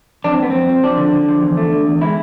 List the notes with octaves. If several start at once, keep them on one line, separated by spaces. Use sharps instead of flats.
F2 D4
C4
F2 B3
F2 C4
F3
F3 D4
D3
D3
F3
E2
A3
D3
E2
G#3 E4